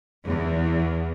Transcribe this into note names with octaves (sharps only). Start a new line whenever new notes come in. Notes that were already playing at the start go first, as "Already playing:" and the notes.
E2